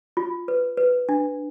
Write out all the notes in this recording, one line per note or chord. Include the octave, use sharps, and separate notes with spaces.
F4
B4
B4
D4